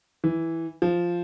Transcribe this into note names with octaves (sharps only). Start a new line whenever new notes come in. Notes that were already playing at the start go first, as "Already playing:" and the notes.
E3
F3